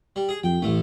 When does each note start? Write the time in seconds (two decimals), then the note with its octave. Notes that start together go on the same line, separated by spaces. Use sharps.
0.16 G3
0.29 G#4
0.44 F2 G5
0.62 A1 A2 A3